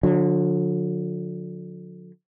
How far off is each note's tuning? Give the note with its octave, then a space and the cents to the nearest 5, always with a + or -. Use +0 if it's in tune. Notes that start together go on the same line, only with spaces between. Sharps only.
D3 +0 F#3 -45